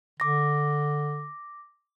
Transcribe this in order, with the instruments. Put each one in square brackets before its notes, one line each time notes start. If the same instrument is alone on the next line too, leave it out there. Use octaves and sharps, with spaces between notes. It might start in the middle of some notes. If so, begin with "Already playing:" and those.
[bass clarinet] D3 [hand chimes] D6 A#6